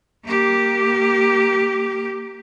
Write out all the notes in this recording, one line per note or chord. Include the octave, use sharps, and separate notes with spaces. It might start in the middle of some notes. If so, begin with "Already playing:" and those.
A#3 G4